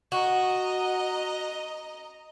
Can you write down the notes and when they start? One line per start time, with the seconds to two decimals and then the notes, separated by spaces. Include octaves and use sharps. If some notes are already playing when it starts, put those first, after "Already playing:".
0.12 F#4 D#5 A#5